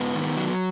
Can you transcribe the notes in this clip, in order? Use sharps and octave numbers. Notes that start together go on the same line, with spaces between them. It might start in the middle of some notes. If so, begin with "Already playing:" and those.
Already playing: G#2 B3
D#3
F#3